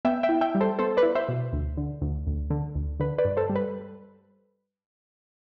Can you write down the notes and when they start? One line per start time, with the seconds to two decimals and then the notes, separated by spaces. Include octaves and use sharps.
0.05 B3 E5 G5
0.23 E5 G5
0.29 E4
0.41 E5 G5
0.55 G3
0.61 A4 C5
0.79 B3 A4 C5
0.97 B4 D5
1.03 E4
1.15 C5 E5
1.29 B2
1.53 D2
1.77 D3
2.02 D2
2.27 D2
2.50 D3
2.75 D2
3.00 D3 B4
3.18 B4 D5
3.25 G2
3.37 A4 C5
3.49 G3
3.56 B4